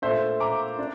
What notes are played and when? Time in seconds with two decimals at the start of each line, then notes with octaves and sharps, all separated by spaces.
0.02 A#2 A3 D4 C5 E5
0.40 A#5 D6
0.79 D4